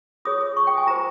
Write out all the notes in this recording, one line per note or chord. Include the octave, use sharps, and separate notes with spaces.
F4 G#4 C#5 D#6
D#6
C#6
G5
G#5
F4 G#4 C5 A#5